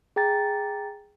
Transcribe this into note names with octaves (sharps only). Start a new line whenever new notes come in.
G#4 G5 A#5 A6